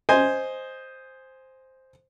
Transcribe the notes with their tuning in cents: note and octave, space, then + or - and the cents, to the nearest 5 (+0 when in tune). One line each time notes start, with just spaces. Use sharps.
C5 +0 D#5 +0 G#5 +0